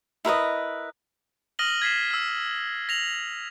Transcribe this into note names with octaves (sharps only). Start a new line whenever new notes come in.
E4 A#4 B4 D#5
D#6 F6 A#6 D#7 F#7 G7
G#6 B6 C7 E7
E6 F6
A#6 F7 F#7